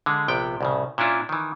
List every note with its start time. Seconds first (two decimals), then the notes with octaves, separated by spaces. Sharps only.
0.06 D3 G#3
0.28 A#1 C3 B3 G5
0.61 C2 A2 C#3
0.98 A#2 C#4 D4 E4 F4
1.29 D#3 E3